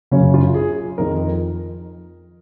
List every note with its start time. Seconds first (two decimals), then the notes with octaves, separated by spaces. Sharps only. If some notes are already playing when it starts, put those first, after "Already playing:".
0.11 F#2 C#3 C#4
0.34 F4
0.55 G#4
0.98 F2 D#3 A#4